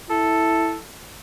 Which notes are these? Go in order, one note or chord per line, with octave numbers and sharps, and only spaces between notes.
E4 A4